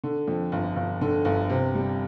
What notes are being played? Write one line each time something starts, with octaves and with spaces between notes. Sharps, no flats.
D3
F2
G1
G1
D3
G1
C3
G3